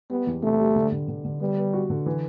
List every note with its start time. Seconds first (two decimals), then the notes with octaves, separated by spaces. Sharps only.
0.10 G3 B3
0.27 E2
0.43 C3 A3
0.59 G3
0.76 D3
0.92 D3
1.08 D3
1.25 D3
1.41 G3 B3
1.57 B3
1.74 F#4
1.90 D3
2.06 E3